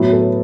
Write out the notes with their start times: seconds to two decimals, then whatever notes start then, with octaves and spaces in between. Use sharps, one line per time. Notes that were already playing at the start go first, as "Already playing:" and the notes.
Already playing: A2 F#3 B3 B4
0.13 A4